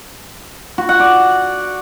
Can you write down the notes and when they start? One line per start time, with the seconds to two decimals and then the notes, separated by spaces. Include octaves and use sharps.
0.78 F#4
0.89 F#5
1.00 D5